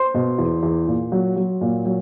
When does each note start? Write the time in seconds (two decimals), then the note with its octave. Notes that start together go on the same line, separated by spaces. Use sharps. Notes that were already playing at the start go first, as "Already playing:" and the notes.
Already playing: C5 C6
0.14 B2
0.38 E2
0.63 E2
0.87 A#2
1.12 F#3
1.36 F#3
1.61 A#2
1.85 F#3